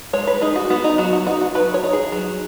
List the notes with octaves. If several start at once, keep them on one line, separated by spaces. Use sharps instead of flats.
G#3 C#5
B4
D#4 G#4
F#4
B3 F#4
D#4
F#3 F#4
F#4
D#4 F#4
F#4
F#3 B4
C#5
D#4
G#4
F#3